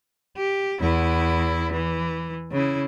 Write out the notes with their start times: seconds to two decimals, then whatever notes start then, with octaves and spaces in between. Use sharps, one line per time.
0.37 G4
0.81 E2 E4
1.72 E3
2.52 C#3 E4